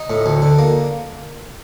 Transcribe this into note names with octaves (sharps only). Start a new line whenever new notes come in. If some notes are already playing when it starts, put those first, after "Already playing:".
Already playing: D#4
A2
D2
D3
A#3